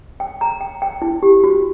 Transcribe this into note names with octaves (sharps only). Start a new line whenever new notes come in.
G5
A#5
G5
G5
E4
G4
F#4